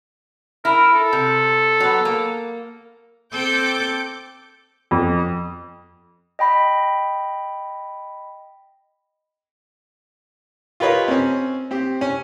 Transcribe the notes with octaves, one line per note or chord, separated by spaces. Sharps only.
E4 A#4
A4
C3
F#3 B3
A#3
C4 A4 D6 G6
F2
D#5 G5 B5 A#6 B6
F4 G4 A#4 B4 C#5 D#5
C4 C#4
C4 G4
C#4